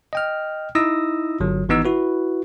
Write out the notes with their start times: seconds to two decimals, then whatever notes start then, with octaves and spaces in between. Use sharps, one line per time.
0.13 D#5 G5 F6
0.75 D#4 E4 D#6 E6 A#6
1.40 G1 F#3
1.69 G#1 E3 B3 D#4 E6
1.85 E4 F#4 B4